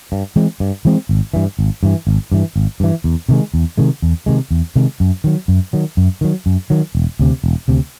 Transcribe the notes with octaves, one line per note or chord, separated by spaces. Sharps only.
G2
E3 G#3 C4
G2
E3 G#3 C4
G#1
G2 E3
G#1
G2 E3
G#1
G2 E3
G#1
G2 E3
E2
C3 D#3 G#3
E2
C3 D#3 G#3
E2
C3 D#3 G#3
E2
C3 D#3 G#3
F#2
D#3 F#3
F#2
D#3 F#3
F#2
D#3 F#3
F#2
D#3 F#3
E1
D2 C3
E1
D2 C3